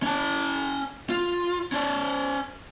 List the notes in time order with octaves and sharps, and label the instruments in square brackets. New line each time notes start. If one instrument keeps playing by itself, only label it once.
[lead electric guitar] C#4 A5
F4
C#4 D5